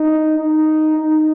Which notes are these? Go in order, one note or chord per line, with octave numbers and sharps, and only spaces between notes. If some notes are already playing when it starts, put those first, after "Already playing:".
Already playing: D#4
D#4
D#4